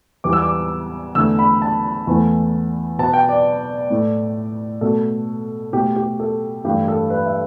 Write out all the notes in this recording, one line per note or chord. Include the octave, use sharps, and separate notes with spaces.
E2 E3 G3 B3 D6
E6
D6
E2 D3 A3 E6
B5
A5
E2 E3 A3
B2 B3 A5
G5
D5
A2 A3
B2 A3 A4
B2 A3 G4
G4
A4
G2 E3 A3 G4
A4
B4
E5